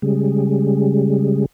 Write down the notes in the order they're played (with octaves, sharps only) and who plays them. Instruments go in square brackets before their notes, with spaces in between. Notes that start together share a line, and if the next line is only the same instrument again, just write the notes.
[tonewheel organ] C#3 G3 G#3